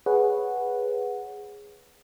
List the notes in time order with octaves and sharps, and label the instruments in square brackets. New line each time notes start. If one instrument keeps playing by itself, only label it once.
[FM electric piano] G#4 B4 C#5 F#5